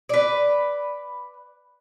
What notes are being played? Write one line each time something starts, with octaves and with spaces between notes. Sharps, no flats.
B4 D5